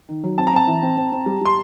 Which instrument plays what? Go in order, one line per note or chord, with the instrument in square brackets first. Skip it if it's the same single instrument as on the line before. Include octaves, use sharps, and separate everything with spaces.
[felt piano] D#3
F#3
[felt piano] C4 [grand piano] A5
[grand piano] A#5
[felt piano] C4 [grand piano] A5
[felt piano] E3
C4
C4
C4
G3
[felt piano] G3 [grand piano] C6